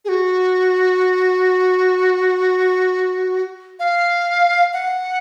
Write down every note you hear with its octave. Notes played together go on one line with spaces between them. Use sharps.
G#4
F#4
F5
F#5